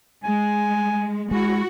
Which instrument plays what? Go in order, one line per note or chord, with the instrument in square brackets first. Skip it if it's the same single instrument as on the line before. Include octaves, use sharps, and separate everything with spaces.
[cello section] G#3 [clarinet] G#5
[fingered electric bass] G#3 [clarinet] E4 [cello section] F#4